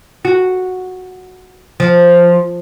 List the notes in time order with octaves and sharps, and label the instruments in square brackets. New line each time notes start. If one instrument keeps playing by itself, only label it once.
[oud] F#4
F3